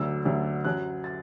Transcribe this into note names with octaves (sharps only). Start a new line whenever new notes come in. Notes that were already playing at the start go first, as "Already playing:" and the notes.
Already playing: D2 D3 F#3 E6
D2 D3 F#3
F#2 F#3 F#6
A6